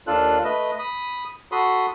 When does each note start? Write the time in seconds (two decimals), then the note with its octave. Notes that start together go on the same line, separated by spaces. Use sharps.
0.07 D#2 D4 F4 A4 F#6
0.44 A3 B4 D#5
0.79 B5 D#6
1.52 F#4 A4 B5 C6 D#6